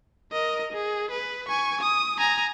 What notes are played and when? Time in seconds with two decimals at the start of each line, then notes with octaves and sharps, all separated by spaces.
0.32 A#4 D#5
0.73 G#4
1.11 B4
1.49 G#5 C#6
1.81 D#6
2.18 G#5 A#5